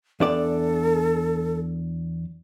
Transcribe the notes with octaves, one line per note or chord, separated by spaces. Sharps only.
E2 D4 A4 D5